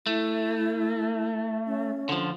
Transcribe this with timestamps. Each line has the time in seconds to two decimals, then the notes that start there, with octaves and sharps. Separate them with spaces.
0.07 A3 E4
1.66 C#4
2.09 D3 F3